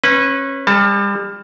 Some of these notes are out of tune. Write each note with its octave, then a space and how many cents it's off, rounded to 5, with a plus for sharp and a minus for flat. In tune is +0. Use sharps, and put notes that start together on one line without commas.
C#4 -25 B4 +0
G3 +35 A4 +0 A5 +20